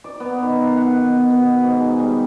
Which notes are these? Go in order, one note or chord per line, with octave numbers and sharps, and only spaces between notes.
D5
B3
D#3
F5
F#5
B2
B3
G#2
G#4
G3